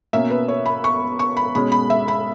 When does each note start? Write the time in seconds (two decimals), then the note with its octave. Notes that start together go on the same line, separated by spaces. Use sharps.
0.13 B2 A#3 C#4 E5
0.30 B4
0.48 C#5
0.66 B5
0.84 C#6
1.19 C#6
1.37 B5
1.55 B2 G#3 C#4 B5
1.72 B5
1.90 E5
2.08 B5